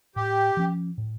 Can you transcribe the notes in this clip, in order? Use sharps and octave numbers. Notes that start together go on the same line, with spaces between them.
A2 G4
F3 C#4
A2